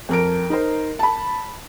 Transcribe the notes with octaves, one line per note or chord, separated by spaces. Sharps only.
F2 A#4 D7
D#4 A#4 C5
A5 B5